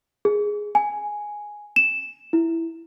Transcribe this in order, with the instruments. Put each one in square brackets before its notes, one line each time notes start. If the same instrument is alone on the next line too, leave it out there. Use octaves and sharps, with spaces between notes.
[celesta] G#4
G#5
E7
E4